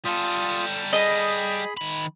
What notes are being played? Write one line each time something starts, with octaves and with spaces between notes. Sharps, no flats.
G3 F4 A4 D#6
G#4 D#5 B5
D#3 B5